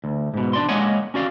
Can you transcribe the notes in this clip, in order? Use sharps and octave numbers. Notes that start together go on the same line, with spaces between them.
D2
G#2 B2
D4 D5 C6
G#3 A#3 C#5 D#5 F#5 G#5
C#4 F#4 D5 F5